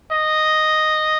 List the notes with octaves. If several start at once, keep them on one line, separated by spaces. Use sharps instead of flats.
D#5